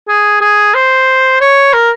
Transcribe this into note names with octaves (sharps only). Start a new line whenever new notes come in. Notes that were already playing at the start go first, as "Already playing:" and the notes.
G#4
G#4
C5
C#5
A#4